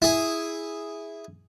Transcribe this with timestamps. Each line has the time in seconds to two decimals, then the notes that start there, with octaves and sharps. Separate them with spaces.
0.02 E4 G#4